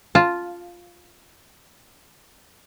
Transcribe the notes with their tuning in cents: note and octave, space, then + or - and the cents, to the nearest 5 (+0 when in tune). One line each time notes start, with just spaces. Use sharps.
F4 +0 A5 -5